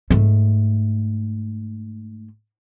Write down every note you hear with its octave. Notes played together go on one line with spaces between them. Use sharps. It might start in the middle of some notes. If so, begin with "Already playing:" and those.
G#2 A3